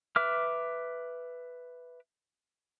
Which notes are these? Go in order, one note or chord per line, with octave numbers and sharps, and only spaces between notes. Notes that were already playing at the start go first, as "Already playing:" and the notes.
B4 E5 D6 F6